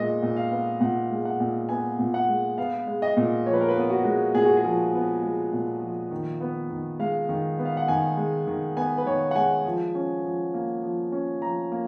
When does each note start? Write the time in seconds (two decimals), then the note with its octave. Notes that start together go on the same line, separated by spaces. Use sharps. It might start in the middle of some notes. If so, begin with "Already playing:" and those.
Already playing: A#2 G#3 B3 D#5
0.22 A#2
0.37 F5
0.51 B3
0.81 A#2 F#5
1.11 G#3
1.25 F#5
1.40 A#2
1.69 B3 G#5
1.99 A#2
2.14 F#5
2.28 G#3
2.58 B3 F5
2.87 G#3
3.02 D#5
3.17 A#2
3.46 F3 C#5
3.53 B4
3.61 A#4
3.69 B4
3.76 B3
3.90 F#4
4.04 G#3
4.35 A#2 G#4
4.45 F#4
4.57 G#4
4.64 F3
4.94 B3
5.23 G#3
5.53 A#2
5.82 F3
6.11 D#3
6.41 B3
6.70 D#3
6.99 G#3 F5
7.29 D#3
7.58 B3
7.65 F5
7.77 F#5
7.88 D#3 G#5
8.17 G#3
8.47 D#3
8.77 B3 G#5
8.98 B4
9.06 D#3 C#5
9.31 F#5
9.35 G#3 G#5
9.66 F3
9.95 C#4
10.24 F3
10.54 A#3
10.83 F3
11.12 C#4
11.42 F3 A#5
11.72 A#3